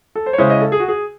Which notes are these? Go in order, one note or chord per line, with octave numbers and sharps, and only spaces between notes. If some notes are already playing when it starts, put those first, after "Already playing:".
A4
C5
C#5
C#3 G#3 C#4 E4 C5
D#5
A4
G#4
F#4
G#4